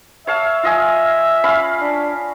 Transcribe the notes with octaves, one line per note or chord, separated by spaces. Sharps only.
C#5 E5 F5 A5
F4 D#5 G#5
C#4 F5 B5
D4